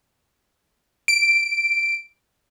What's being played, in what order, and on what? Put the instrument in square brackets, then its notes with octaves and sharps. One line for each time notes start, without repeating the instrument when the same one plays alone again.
[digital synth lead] D7